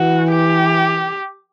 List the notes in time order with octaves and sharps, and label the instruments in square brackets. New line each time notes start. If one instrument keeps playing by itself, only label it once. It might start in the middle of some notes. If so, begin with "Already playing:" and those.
Already playing: [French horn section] E3 [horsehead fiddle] F#4
[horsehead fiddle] G4